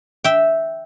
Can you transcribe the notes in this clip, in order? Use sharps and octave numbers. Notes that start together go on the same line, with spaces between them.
E5 G5